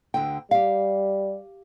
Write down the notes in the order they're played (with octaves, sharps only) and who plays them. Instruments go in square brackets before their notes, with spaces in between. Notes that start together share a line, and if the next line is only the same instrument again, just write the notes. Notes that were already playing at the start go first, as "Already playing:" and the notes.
[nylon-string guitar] D2 D3 G5
[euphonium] G3 [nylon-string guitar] G4 F5